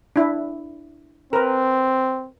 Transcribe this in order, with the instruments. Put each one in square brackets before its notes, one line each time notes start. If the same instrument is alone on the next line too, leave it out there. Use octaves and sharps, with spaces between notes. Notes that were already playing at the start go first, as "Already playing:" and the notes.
[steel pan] D4 E4
[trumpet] C4 [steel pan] A#4 B4